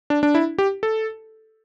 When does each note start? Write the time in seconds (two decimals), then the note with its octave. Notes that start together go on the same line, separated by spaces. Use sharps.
0.10 D4
0.23 D4
0.35 E4
0.58 G4
0.83 A4